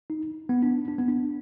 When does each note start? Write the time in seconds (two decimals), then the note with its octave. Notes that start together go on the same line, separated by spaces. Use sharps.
0.10 D#4
0.49 B3
0.63 D4
0.88 D4
0.98 B3
1.08 D4